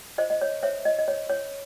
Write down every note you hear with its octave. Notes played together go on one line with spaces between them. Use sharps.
C5 D#5
D#5
C#5
C5 C#5 E5
D#5
D#5
C5 C#5
C#5